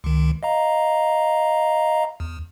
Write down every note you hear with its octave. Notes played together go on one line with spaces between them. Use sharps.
C#2 D#3
D#5 F5 A#5
E2